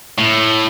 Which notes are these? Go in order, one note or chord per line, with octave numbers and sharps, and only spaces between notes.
A2